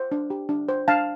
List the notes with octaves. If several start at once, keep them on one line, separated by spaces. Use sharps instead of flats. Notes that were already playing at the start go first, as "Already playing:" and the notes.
Already playing: C5
D4
G4
D4
C5
D4 F5 A5